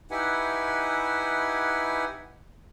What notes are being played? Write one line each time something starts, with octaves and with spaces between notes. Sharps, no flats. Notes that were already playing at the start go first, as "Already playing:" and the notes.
D#4 E4 G4 B4 F#5 G#5